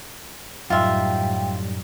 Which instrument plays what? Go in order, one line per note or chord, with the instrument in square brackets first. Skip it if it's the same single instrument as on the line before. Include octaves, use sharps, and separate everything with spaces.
[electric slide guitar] F#2 D#4 [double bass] A2 G3 [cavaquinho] F4 E5 [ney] G5